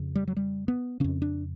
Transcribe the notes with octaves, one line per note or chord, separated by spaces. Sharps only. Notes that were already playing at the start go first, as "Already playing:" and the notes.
Already playing: F2 C#3
G3
F#3
G3
B3
F2 C#3 C#4
D4